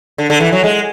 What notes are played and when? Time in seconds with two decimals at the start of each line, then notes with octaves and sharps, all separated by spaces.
0.18 D3
0.30 D3
0.40 E3
0.53 F#3
0.64 G#3